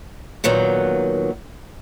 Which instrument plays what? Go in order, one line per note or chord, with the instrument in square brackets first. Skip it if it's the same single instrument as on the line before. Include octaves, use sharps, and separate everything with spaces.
[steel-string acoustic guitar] A#2 D#3 F#3 B3